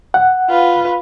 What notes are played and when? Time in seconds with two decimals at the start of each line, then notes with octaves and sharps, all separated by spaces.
0.14 F#5
0.49 F4 B4